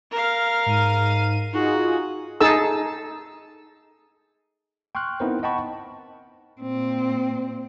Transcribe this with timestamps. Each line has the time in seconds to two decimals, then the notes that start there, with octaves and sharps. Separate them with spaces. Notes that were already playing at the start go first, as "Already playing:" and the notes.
0.11 A#4 F5
0.66 G#2 D#7
1.53 D#4 F4 F#4 G#4
2.41 D#4 G#4 A4 A5 E6
4.95 G5 C6 C#6 F6 F#6
5.20 B3 C4 D#4 E4 A#4 C5
5.43 D#5 F#5 G5 A5 B5 C#6
6.61 A#2 C4